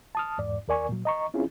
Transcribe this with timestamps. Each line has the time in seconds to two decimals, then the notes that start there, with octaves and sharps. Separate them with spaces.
0.15 A5 D#6 F6
0.38 E2 G#2 D5
0.68 D#2 A#4 D5 G#5 C#6
0.89 A#2 F#3
1.05 D#5 A#5 C#6
1.34 C4 C#4 E4 F4 G#4